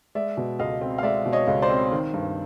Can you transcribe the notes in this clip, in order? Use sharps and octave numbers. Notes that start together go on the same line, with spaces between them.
G#3 D5 E5
B2
C#2 D#5 F5
C4
F5
G#3 D5 E5
B2
C#5 D#5
C#2
C5 D5
C4
D#3
G2